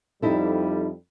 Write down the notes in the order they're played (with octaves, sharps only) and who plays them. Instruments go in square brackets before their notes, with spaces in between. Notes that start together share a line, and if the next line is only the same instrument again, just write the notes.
[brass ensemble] F2 G3 [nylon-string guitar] D#4 E4 A4